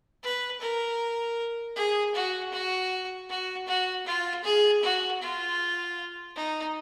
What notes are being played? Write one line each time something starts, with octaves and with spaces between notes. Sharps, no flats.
B4
A#4
G#4
F#4
F#4
F#4
F#4
F4
G#4
F#4
F4
D#4